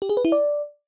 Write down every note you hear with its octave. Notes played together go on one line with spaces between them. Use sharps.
G4
G#4
B4
E4
D5